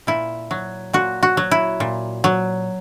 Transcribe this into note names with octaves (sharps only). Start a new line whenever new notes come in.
A#2 E4
F#3
A#2 F#4
F#4
F#3
E4
A#2
F#3